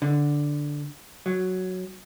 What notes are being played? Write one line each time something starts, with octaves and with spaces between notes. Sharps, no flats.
D3
F#3